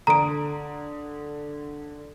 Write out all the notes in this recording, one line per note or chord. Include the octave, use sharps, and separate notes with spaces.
D3 A#5 D#6 D7